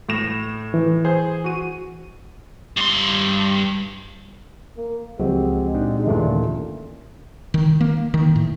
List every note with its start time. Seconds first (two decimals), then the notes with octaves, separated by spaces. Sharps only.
0.09 A2 A#6 E7
0.74 E3
1.04 G#4 C5
1.44 F#4 D#7
2.77 G2 C6
4.77 A#3
5.19 C#2 F3 F#3 G#3 C4 G4
5.75 A#2 D4 D#4
6.06 A1 D#2 A#2 D3 E3 A3 D4
7.54 D#3
7.81 A#3
8.14 D#3
8.36 A2